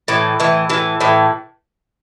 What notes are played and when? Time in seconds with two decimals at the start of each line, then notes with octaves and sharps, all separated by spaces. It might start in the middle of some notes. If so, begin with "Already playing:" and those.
0.08 A2 E3
0.40 A2 E3
0.70 A2 E3
1.00 A2 E3